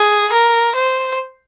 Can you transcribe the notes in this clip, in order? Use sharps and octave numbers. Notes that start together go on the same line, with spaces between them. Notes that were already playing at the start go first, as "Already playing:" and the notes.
Already playing: G#4
A#4
C5